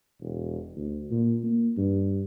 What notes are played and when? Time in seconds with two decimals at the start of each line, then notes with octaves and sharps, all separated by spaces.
0.21 E1
0.76 D2
1.11 A#2
1.44 A#3
1.77 G2